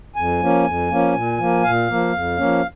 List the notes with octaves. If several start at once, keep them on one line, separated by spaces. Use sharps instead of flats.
F2 G#5
F3 A#3 C#4
F2
F3 A#3 C#4
A#2
F3 A#3
A#2 F5
F3 A#3
F2
F3 A#3 C#4